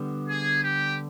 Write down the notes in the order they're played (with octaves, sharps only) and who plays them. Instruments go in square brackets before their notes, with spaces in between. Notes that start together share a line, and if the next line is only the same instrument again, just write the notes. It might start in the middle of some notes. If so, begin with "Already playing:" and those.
Already playing: [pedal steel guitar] D3 G3 B3
[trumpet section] G#4
G4